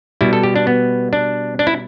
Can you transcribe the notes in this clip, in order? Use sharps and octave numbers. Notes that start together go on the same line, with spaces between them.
B2 G3 E4
A4
G4
D4
B3
D4
D4
E4